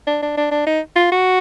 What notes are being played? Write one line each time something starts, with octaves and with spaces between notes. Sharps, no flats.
D4
D4
D4
D4
D#4
F4
F#4